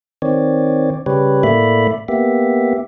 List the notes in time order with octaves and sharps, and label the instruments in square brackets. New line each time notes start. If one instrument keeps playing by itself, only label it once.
[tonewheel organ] D#3 C4 C#5 D5
C#3 G3 G4 B4 C#5
A2 A3 A#3 D5 E5 B5
A#3 B3 G4 E5